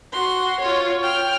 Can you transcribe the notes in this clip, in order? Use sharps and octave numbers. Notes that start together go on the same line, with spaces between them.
F#4 C6
F4 C#5
G5 F6